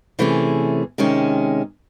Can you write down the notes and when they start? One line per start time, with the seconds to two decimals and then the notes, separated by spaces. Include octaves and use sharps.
0.19 C3 E3 A3 C#4 G#4
0.98 C3 D#3 G#3 C#4